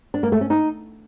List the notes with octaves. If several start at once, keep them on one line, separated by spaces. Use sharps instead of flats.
D4
A#3
A3
C#4
D#4